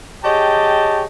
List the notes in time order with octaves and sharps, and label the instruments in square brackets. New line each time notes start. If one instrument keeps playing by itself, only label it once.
[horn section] G4 G#4 C#5 D#5 G5 A5